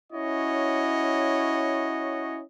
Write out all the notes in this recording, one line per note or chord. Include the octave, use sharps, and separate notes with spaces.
C#4 E4 F#4 C#5 D#5